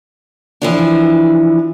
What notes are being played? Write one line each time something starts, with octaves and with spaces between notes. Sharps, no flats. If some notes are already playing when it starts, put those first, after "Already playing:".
E3 F3 D4